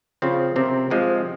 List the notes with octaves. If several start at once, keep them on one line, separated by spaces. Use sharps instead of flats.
C#3 F3 C4 F4
C3 F3 C4 G4 A#4
F3 G#3 C4 G4